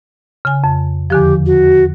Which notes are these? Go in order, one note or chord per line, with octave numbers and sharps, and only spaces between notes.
C#3 G#5
F2
E2 D3 F3 G4
F#4